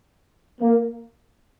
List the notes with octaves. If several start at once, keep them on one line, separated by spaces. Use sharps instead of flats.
A#3